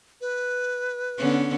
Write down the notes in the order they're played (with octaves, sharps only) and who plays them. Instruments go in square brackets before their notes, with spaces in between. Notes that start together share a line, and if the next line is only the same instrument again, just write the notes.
[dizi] B4
[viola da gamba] D3 B3 C#4